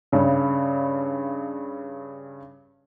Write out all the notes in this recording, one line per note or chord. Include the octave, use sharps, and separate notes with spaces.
G2 C#3